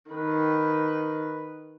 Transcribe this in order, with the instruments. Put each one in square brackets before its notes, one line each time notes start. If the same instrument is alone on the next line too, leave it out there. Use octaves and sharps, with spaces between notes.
[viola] D#3 B4